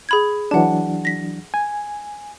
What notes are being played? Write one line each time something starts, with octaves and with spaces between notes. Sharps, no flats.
G#4 B5 G#6
E3 F#3 D4 F#5 A5
A#6 B6
G#5